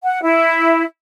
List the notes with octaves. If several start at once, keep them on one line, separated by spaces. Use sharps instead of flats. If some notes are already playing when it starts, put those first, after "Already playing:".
F#5
E4